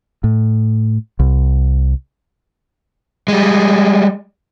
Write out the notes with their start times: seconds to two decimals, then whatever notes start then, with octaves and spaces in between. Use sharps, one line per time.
0.24 A2
1.19 C2
3.28 G3 G#3